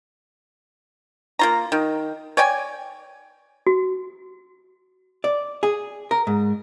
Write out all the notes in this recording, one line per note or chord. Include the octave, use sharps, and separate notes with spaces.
A#3 F4 A#5
D#3
C#5 D5 G5 G#5
F#4
D5
G#4
A#4
G#2